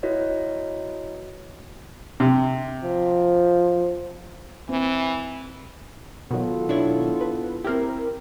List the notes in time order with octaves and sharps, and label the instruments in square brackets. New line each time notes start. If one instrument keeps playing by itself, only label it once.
[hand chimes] E4 F#4 B4 C#5 D#5
[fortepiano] C3
[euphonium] F3
[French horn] E3 [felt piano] C4
[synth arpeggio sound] B2 D#3 F#3 [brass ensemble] B3 F4 A4
[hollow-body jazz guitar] D4 E4 C#5
[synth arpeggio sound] B4
[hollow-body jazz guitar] C4 E4 [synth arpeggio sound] G4 A#4